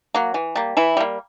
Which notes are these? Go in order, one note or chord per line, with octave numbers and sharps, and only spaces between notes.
F#3 A#3
E3
G3 A#3
E3 E4
G3 A#3